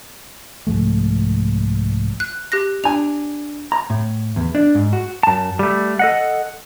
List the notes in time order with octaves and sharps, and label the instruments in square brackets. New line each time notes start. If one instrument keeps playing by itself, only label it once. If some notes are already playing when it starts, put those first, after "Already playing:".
[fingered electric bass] C2 G#2 F3 A3
[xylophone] F#6
G4 F#6 A#6
[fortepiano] D4 G#5 [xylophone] F7
[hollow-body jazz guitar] A#5
A2
E2
D4
G#2
F#4
[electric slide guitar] F#2 A5
G3 A3
A4 D#5 F#5